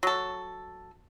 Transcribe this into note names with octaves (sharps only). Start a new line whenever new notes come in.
F#3 A4